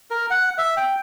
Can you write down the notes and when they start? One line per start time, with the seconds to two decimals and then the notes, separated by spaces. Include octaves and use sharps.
0.11 A#4
0.30 F#5
0.58 E5
0.77 G5